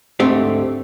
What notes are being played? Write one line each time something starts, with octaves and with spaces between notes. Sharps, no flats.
D2 G#2 D3 A3 C4 G4